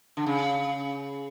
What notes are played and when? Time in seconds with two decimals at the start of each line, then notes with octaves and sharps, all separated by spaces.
0.17 D3
0.26 C#3